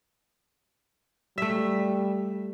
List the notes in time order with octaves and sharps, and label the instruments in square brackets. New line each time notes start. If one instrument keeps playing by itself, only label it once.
[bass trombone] G3 [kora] A3 E5